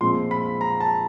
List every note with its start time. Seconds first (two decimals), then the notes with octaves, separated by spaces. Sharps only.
0.01 A#2 F3 G#3 C4 C6
0.31 B5
0.61 A#5
0.80 A5